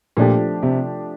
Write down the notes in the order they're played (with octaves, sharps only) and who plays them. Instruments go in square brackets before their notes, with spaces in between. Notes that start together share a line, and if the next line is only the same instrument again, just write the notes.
[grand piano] A#2 [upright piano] F3 A3 D4 G4
[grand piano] C3